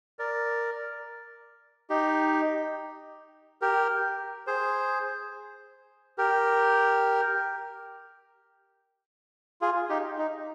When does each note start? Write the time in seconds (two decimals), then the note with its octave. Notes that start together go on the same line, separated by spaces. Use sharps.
0.19 A#4 D5
1.90 D#4 G4
3.62 G4 A#4
4.47 G#4 C5
6.18 G4 A#4
9.61 F4 G#4
9.89 D#4 G4
10.18 D#4